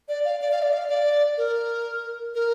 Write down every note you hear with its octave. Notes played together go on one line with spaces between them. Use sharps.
D5
F5
D5
F5
D5
F5
D5
A#4
A#4